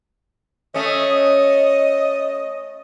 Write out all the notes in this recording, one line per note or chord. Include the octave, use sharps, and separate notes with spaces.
A3 C#4 D#5